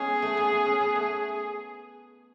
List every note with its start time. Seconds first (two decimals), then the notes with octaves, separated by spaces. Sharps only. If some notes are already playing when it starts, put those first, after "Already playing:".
Already playing: G#3 B3 C#4 G#4
0.22 A3
0.37 B3
0.52 B3
0.66 C#4
0.81 B3
0.96 A3